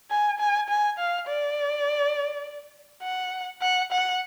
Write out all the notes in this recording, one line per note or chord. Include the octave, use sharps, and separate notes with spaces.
G#5
G#5
G#5
F5
D5
F#5
F#5
F#5